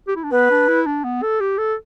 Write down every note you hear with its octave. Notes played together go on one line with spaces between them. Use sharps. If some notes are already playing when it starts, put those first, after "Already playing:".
G4
E4
D4
B3 B4
D4
E4
D4
B3
A4
G4
A4